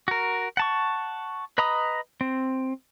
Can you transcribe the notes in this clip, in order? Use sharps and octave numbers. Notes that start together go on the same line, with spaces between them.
F#4 A#4
F#5 A5 C#6
B4 D#5 A#5 B5 D#6
C4